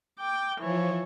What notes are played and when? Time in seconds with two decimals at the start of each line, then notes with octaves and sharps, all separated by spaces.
0.19 G5 D6
0.60 E3 F3 C#5